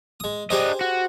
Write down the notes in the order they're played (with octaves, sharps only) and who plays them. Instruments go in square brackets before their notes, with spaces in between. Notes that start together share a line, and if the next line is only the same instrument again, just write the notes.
[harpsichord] G#3 D#6
[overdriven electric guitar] D4 D#5 [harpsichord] G4 G#4 C5
[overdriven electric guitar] F#4